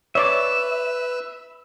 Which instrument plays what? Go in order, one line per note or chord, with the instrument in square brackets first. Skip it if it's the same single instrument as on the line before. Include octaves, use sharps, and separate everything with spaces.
[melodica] B4 [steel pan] C#5 D5 D6 [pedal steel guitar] E5